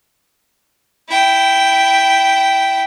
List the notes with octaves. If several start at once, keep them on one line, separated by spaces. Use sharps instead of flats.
E4 G5